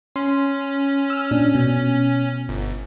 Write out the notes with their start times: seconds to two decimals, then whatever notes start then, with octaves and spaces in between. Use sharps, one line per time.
0.16 C#4 C6
1.10 E6 F6
1.31 A#2 D4
1.55 B2
2.49 G1